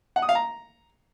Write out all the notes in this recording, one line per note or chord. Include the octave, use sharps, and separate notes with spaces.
F#5
D#6
F5
A#5